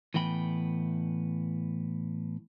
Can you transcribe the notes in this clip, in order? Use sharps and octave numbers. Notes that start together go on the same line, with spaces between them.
A2 E3 B3 G5 B5